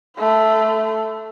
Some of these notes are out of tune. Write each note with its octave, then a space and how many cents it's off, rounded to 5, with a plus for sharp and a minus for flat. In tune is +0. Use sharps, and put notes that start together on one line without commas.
A3 +0 C6 -45